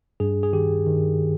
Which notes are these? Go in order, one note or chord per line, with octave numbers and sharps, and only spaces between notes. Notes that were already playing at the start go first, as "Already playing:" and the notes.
G2 G#4
G#4
D#3 G4
D#3